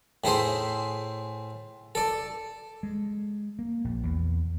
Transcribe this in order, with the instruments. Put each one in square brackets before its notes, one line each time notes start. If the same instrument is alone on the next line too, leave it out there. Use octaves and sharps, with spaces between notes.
[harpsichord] A2 E4 G#4 C5
A4 D5
[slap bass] G#3
A#3
A#1
E2